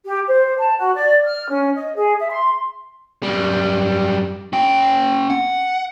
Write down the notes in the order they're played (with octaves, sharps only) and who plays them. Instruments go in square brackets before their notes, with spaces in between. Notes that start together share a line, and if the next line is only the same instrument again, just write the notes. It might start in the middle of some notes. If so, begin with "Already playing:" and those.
[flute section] G4
C5
A5
F#4
D5
F6
C#4
D#5
G#4
E5
C6
[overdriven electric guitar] F#2 G3
C#4 G5
F#5